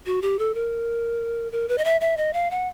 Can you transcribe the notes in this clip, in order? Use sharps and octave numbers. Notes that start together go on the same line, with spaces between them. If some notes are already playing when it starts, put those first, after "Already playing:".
F#4
G4
A4
A#4
A#4
B4
D#5
E5
E5
D#5
F5
F#5